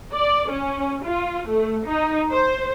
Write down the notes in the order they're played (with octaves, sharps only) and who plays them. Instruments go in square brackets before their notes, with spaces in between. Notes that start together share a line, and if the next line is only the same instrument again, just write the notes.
[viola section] D5
C#4
F4
A3
D#4
C5